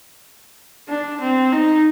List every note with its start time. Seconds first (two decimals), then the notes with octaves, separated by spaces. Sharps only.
0.89 D4
1.21 C4
1.53 D#4